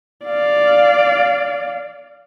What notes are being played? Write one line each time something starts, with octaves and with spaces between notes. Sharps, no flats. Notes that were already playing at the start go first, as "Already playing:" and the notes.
D5 F5